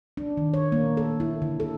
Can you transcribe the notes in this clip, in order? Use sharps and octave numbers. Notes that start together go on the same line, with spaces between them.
D4
D#3
C#5
A#3
A4
E4
D3
A4